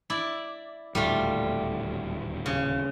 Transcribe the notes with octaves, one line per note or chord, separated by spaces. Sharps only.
E4 D5
D#1 D2 A2 G3 A3 F4
C#3